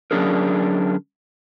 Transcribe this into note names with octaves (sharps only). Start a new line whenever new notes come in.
D3 F#3 C#4 D4 G#4 A#4